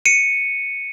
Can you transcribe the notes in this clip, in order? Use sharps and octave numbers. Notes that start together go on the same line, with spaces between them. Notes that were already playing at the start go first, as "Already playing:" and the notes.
C#7 D#7